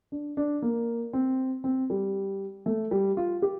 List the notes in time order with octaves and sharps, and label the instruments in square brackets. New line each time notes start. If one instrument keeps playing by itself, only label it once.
[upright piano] D4
D4
A#3
C4
C4
G3
A3
G3
F4
G4